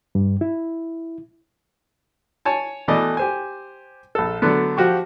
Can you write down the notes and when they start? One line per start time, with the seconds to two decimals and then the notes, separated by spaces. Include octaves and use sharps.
0.15 G2
0.41 E4
2.45 C#5 G#5 A5
2.88 B2 E3 A3 D5 D#5
3.17 G4 C5 G#5
4.15 A#1 A4
4.42 D3 F#3 A3 B3
4.77 F3 F#4 G4 C#6